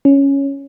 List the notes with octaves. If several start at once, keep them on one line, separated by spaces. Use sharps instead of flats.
C#4